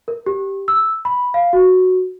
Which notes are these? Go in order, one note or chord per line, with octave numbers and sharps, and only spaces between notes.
A#4
G4
E6
B5
F5
F#4